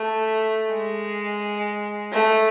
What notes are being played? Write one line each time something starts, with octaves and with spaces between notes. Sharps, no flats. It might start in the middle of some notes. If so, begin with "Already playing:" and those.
Already playing: A3
G#3
A3